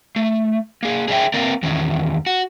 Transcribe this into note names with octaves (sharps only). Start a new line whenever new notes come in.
A3
A#3 G#4
G#4 C#5 D#5 E5 G5
A#3 C4 A#4 D5
E2 D#3 C#4
F#4